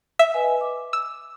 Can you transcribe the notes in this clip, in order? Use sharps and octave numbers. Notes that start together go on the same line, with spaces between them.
E5
B4 D#5 G#5
D6
E6